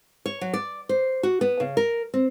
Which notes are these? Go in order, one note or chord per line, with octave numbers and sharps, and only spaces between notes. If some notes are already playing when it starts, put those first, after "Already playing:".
C#5
F#3
D5
C5
F#4
B3
C#3
A#4
C4